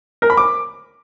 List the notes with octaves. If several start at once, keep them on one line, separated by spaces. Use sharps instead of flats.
A#4
B5
D6